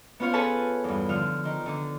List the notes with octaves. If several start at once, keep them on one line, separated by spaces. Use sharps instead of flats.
B3 C#4 F4 C5 C#5 F5
G#4 A4 B4 C#5 G#5 A5
E2 G2
D3 F3 F6
D#3
D3 D4